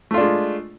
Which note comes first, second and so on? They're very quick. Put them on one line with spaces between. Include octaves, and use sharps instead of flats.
A3 F4 D4 G#3